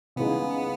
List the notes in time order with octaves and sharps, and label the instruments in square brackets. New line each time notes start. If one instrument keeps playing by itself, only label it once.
[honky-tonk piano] C#3 E3 G#3 D#4 [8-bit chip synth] B3